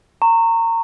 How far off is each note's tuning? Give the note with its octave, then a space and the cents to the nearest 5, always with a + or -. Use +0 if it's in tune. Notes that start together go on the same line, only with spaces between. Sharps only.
A#5 -25 C#6 -20